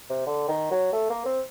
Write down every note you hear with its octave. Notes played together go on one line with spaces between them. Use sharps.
C3
D3
D#3
F#3
A3
A#3
C4